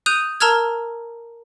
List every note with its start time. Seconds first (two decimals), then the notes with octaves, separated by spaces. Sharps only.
0.06 D#6 F#6 G6 D#7 F7
0.40 A#4 A5 A#5 E6 F6 G#6